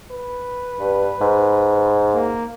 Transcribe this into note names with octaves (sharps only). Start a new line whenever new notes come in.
B4
G2
G#2
A#3